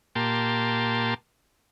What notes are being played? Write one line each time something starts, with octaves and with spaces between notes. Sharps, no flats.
A#2 A#3 G4 A5 C6